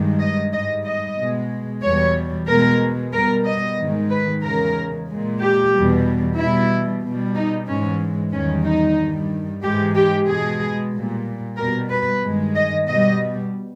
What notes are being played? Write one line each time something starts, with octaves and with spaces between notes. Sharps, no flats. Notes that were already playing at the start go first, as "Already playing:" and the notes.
Already playing: G2 D#3 G#3
D#5
G#2 G3 D#5
D#5
B2 G#3
E2 B2 G3 C#5
B2 G#3 A#4
B2 G3 A#4
D#5
G#2 D#3 G#3
B4
E2 C#3 G#3 A#4
A#2 G#3
G4
E2 B2 G3
B2 G3 E4
B2 G3
D#4
G#2 E3 G#3 C#4
E2 D#3 G3 C#4
D#4
G2 D#3 G3
G#2 E3 G#3 G4
G4
B2 G#3 G#4
A#2 G3
B2 G3 A#4
B4
G2 D#3 G#3
D#5
B2 G3 D#5